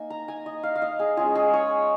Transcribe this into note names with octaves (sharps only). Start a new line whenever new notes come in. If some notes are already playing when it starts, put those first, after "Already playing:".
Already playing: A#3 D#4 G#5
A#5
G#5
D#5
F5
F5
D#5
G#4
G#3 C#4 F4 G#4
G#4
C#5